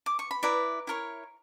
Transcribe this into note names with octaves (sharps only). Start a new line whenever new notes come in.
D6
C#6
B5
E4 B4 D5 A#5
E4 A#4 C#5